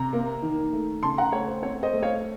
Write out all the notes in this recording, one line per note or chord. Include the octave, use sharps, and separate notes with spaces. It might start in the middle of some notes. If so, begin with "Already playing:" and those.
Already playing: C3 A#5
A#3
D#3
A3
C#3 A5 C6
F#5 A#5
A3 C#5
C5
C4 C#5
C5 D#5
A3
C#5 F5